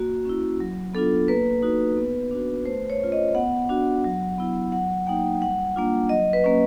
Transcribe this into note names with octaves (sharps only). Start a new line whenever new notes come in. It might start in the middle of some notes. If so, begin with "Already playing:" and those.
Already playing: A#3 F#4
C#4 E4
F#3
B3 D4 F4 A4
A#3 B4
D#4 F#4
B3
D4 F#4
A3 C5
C#5
C#4 F4
D#5
B3 F#5
D4 F#4
F#3
B3 E4
F#3 F#5
A#3 D#4 G5
G3 F#5
A#3 D4 F4
F#3 D#5
B4
A#3 C#4